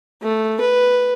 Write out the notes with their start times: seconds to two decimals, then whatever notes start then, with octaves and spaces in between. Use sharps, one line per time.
0.22 A3
0.61 B4